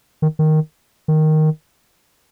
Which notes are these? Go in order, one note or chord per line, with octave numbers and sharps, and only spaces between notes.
D#3
D#3
D#3